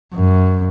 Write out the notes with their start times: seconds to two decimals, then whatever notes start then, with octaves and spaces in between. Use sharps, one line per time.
0.15 F#2